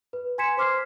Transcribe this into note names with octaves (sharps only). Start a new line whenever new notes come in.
B4
G#5 C6 G#6 B6 C#7 E7
C5 C6 D6 F6 B6 C7